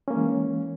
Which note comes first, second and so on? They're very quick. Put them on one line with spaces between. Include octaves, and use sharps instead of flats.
C#4 A#3 G#3 E3